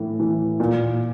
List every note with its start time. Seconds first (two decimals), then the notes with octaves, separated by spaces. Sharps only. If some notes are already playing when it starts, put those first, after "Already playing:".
Already playing: A2 E3
0.19 E3
0.60 A#2